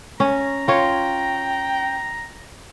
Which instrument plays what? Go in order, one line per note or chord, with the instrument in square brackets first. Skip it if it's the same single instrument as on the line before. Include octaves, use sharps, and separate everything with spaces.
[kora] C#4 [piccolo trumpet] A#5
[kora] F4 C#5 [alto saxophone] G5